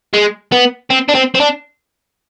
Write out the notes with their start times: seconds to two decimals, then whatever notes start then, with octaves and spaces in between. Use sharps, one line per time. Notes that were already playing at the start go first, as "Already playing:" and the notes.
0.14 G#3
0.52 B3
0.90 C4
1.09 D4
1.15 C4
1.35 C4
1.40 D4